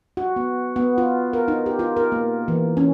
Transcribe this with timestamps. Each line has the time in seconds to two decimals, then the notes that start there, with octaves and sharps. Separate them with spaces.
0.17 F#4
0.36 B3
0.76 B3
0.98 F4
1.33 A#4
1.48 D#4
1.66 G4
1.79 F4
1.97 A#4
2.12 A#3
2.48 E3
2.77 C#4